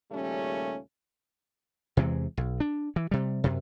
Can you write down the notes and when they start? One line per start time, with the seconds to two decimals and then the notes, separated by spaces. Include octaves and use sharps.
0.11 D#2 A#2 C#3 G3 A3 C#4
1.97 E2 C3 E3 G#3
2.37 B1
2.60 D4
2.96 E3
3.11 C3 G3
3.44 F#2 C3